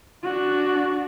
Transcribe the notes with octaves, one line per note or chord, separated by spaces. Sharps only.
D4 F#4